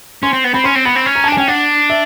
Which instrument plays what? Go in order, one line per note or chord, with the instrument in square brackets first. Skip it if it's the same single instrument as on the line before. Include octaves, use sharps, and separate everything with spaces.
[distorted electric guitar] C#4 [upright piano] C6
[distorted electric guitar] C4
B3
[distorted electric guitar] C4 [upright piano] B5
[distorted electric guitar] C#4 [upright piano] C6
[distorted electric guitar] C4
[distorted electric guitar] B3 [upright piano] B5
[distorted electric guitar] C4
C#4
[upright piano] A#5
A5
[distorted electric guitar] D4
[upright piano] G#5
[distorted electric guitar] C#4 [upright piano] G5
[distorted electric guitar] D4 [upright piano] F#5
[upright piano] E5